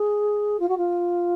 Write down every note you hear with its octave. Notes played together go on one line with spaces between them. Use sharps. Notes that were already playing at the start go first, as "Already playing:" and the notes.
Already playing: G#4
F4
F#4
F4